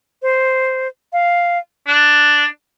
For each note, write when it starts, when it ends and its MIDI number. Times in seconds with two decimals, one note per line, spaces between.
0.22 0.88 72
1.13 1.58 77
1.87 2.45 62
1.87 2.42 90